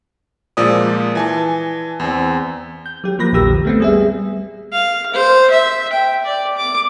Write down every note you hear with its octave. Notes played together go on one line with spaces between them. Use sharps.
A#2 F3 G#3 D5 D#6
E3 G#5 A5
E2 C4
G6
F#3 G4
F3 A#3 A#4 B5 A#6
A#1 E2 D3 G4 E6 A#6
A3 B3 C4
G3 G#4 E5
F5
C5
E5
G5
D5
D6